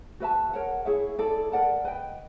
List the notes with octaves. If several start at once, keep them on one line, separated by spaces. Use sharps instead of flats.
F#4 B4 E5 A5
A#4 C#5 F#5
E4 G#4 C#5 E5
E4 A4 D5
A#4 D5 F#5 A5
B4 D#5 G5